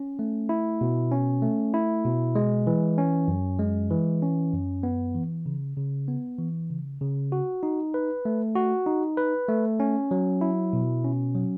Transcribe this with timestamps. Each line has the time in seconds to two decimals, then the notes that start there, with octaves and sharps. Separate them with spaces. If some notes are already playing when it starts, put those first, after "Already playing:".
Already playing: C#4
0.19 A3
0.49 E4
0.81 B2
1.12 C#4
1.42 A3
1.74 E4
2.05 B2
2.35 G#3
2.67 E3
2.98 C#4
3.28 F#2
3.59 G#3
3.90 E3
4.22 C#4
4.53 F#2
4.83 B3
5.15 E3
5.46 C#3
5.77 C#3
6.08 B3
6.39 E3
6.70 C#3
7.01 C#3
7.32 F#4
7.63 D#4
7.94 B4
8.25 A3
8.55 F#4
8.86 D#4
9.17 B4
9.48 A3
9.80 C#4
10.11 F#3
10.41 E4
10.73 B2
11.04 C#4
11.35 F#3